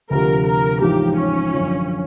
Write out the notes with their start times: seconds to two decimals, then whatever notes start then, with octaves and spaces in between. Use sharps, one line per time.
0.10 D2 C3 F3 A#4
0.46 A#4
0.81 A1 G#2 F3 G4
1.17 C#4
1.53 F#2 D3 F3